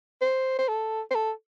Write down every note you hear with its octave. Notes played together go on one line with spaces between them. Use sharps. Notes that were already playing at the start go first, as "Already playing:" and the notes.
C5
C5
A4
C5
A4